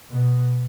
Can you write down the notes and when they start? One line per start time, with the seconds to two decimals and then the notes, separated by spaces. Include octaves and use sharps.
0.11 B2